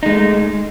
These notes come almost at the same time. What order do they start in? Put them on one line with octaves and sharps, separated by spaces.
D#4 G#3 A3